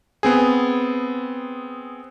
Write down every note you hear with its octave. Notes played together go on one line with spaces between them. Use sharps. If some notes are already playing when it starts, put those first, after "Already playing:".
B3 C4 G#4